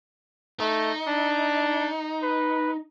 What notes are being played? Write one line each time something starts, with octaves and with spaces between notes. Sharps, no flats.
A3 D#4
D4
B4